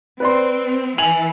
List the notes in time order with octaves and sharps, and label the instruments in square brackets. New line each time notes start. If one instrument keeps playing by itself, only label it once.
[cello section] C4 [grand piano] B4 D5 C6
[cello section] E3 [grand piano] G#5 F7 F#7